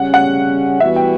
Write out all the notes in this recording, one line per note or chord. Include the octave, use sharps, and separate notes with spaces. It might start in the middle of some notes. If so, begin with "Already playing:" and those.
Already playing: C#3 G3 C#4 F#5
F#5
E3 G3 B3 F#4 E5
G5